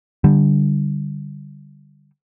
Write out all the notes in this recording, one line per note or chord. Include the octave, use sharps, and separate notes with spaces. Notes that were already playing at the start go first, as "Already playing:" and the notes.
D3 G3